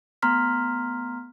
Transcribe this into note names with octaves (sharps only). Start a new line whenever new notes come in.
A3 B3 A#5 C6 F6 B6